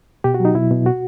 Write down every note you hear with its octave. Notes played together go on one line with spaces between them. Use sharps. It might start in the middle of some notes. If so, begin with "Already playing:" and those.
B2 G4
F#4
F#3 D#4
B2 E4
B2
F#4